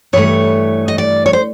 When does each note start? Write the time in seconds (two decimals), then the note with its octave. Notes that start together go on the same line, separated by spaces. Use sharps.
0.13 G2 E3 A3 C#5
0.88 D#5
0.98 D5
1.26 C#5
1.33 C5